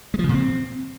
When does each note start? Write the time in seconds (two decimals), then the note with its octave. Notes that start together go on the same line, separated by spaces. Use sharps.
0.14 G#3
0.19 F3
0.24 C#3
0.29 A#2
0.34 C4